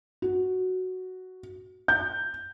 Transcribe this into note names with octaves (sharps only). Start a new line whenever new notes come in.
F#4
G6